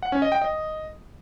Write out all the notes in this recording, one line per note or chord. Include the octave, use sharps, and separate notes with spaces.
F#5
C#4
D#5
G5
D#5